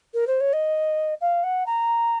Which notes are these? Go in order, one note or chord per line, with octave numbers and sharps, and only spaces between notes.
A#4
C5
C#5
D#5
F5
F#5
A#5